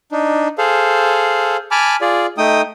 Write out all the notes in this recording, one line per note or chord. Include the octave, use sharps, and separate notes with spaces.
D4 D#4
G#4 A4 C5 F5
G#5 A5 B5 D6 F6
F4 G#4 D5
A3 D#4 G5 D#6